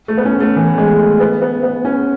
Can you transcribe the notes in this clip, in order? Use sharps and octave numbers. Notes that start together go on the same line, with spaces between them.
A3
B3
C#4
A3
E3
G#3
A3
B3
B3
B3
C#4